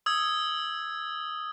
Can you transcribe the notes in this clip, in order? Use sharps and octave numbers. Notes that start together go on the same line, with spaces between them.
D#6 E6 G#6